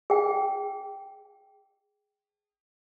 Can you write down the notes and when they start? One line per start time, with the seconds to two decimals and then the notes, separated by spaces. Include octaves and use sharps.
0.10 G#4 G5